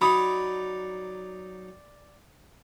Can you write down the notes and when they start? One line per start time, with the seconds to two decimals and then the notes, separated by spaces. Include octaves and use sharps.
0.01 F#3 D#4 D5 B5 D#6